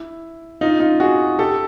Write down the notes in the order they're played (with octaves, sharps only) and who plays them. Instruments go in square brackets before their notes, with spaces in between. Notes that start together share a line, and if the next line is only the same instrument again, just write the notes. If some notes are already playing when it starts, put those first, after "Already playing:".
Already playing: [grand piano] E4
D#4 F4
D#4 F4
F#4 G#4
G4 A4